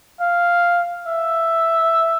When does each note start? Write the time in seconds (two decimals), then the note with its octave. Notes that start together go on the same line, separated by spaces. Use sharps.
0.20 F5
1.07 E5